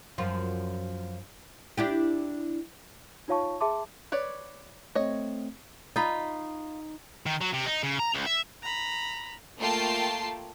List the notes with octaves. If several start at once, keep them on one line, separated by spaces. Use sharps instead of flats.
F#2 F3 F4
D4 E4 G4
D#4 F4 C#5 F5 A5 C#6
G#4 E5 A5 C6 D6
B4 C#5 D5
A3 C4 C#5 D#5
D#4 F4 B5
D#3
F#3
C3
D#4
C#3
A#5
C#2
E5
A#5 B5
A3 A#3 F4 G5 A5 C7